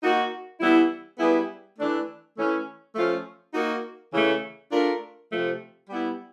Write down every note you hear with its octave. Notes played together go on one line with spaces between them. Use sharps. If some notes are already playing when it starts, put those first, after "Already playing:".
A#3 D#4 F#4
E3 G3 B3 E4
G3 B3 E4 G#4 B4
E3 A3 D4
E3 A3 C#4
F3 A3 C#4 F4
A#3 D#4 F#4
C#3 E3 A3
A3 D4 F4 A#4
C3 F3 A3
G3 B3 E4